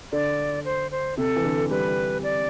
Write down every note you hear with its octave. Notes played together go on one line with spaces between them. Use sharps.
D3 D5
C5
C5
C3 A4
E3
D3
G3 B4
D5